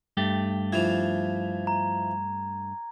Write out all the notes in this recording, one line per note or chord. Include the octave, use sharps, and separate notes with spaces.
G2 A3 G4
E3 F3 G#6
A#5